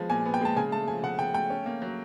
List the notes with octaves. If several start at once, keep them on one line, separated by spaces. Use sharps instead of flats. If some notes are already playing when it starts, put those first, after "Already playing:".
Already playing: F3 G#3 B3
A#2 G#5
B3
G5
G#3 A5
C#3 G#5
A3 A5
F3 G#5
C#3 F#5
C#3 G5
A3 G5
C#4
A#3
F#3